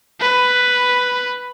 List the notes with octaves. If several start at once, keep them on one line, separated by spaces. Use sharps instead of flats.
B4